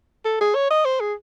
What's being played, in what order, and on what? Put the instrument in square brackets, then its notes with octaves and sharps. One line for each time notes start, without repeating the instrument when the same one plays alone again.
[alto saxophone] A4
G#4
C#5
D#5
C5
G#4